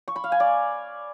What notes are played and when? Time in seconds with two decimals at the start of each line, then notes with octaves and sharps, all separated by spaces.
0.08 C#6
0.16 B5
0.24 F5
0.32 G#5
0.40 D5